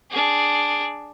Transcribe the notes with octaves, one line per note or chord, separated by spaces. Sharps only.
D4 G#4